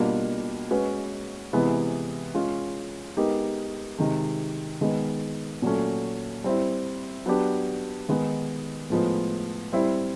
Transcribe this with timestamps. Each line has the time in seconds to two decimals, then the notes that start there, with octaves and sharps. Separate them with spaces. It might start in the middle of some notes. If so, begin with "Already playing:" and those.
Already playing: B2 G3 A#3 D4 F4
0.71 G#3 C#4 F#4 B4
1.53 C3 E3 G#3 B3 E4
2.34 G#3 C#4 F4
3.17 G#3 B3 D#4 G4 A#4
3.98 C3 D#3 G#3
4.81 D#3 G#3 B3
5.62 A#2 F#3 A3 C#4
6.44 G3 C4 E4
7.26 F#3 B3 D4 G4
8.09 D#3 G#3 B3 D#4
8.90 A2 F3 G#3 B3
9.73 G3 C4 E4